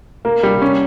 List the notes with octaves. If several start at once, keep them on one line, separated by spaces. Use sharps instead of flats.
A#3
G3
C#4